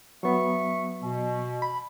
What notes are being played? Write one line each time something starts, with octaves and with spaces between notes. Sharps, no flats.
F#3 B3 E5 C#6
B2
B5